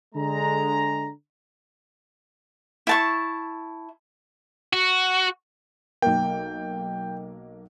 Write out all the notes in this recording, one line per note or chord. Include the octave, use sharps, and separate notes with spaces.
D3 G#3 A#5
E4 A5 C#6
F#4
B1 A#3 G5